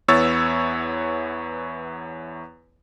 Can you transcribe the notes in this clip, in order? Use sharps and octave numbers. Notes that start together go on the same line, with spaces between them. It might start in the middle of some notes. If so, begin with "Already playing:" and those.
E2 B3 E4 C#5 E6 A6